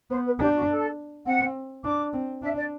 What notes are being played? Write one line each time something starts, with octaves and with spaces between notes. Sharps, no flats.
B3 C5
B4
D4 G4
F#4
A4
C4 F#5
D4 D6
C4
D4 E5
D5